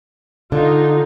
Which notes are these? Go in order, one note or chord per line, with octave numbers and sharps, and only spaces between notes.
D3 D#4 F4